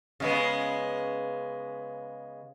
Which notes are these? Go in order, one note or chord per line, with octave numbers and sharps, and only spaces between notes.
C#3 G#3 B3